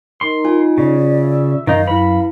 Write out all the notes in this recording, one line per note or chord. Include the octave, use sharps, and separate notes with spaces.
D#4 A#4 C6
F4 G#5
C#3 D5
E5
F#2 D#3 D#4 F5
F#2 E4 B4 B5